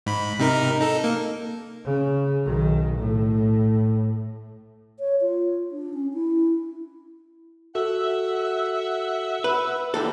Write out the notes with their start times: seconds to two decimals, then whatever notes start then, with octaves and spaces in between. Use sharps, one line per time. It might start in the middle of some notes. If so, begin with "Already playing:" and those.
0.06 G#2 B5
0.39 C3 D#4 A#4
0.80 D#4 A4
1.04 A#3
1.85 C#3
2.45 B1 D#3
2.98 A2
4.99 C#5
5.22 F4
5.71 D4
5.94 C#4
6.14 E4
7.75 F#4 A4 E5 F#5
9.44 B4
9.94 D#2 C3 E3 G3 A4